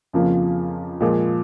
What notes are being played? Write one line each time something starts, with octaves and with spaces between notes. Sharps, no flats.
F2 C#3 F3 A#3 F4
A#2 F3 G#3